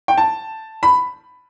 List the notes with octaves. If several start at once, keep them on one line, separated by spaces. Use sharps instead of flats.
G5
A5
B5